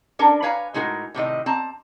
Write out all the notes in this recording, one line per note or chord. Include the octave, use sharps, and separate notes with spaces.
C#4 D4 A4 A#4
B4 C#5 F5 G#5 A#5
A2 G#3 D#4 F#4 A#4
A2 C3 D#3 D#5
C4 A5 A#5